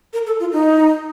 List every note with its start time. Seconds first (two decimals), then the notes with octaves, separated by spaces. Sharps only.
0.13 A#4
0.27 A4
0.40 F4
0.53 D#4